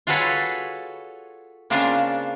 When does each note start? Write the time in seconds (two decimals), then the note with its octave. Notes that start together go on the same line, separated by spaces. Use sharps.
0.07 F4 F#4 G#4 A4 B4 C#5
1.70 C#3 A#3 C4 D4 F4 A5